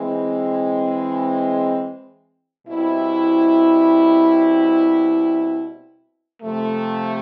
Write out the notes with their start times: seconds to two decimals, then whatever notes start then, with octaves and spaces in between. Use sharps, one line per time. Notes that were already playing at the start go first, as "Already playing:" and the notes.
Already playing: E3 G#3 C4
2.66 B2 G3 C4 E4
6.41 C3 F3 A3